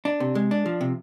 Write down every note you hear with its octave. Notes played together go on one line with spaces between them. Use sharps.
D4
C3
G#3
D4
F3
C3